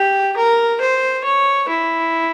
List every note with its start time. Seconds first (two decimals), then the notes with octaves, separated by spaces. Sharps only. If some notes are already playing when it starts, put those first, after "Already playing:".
Already playing: G4
0.36 A#4
0.81 C5
1.24 C#5
1.68 E4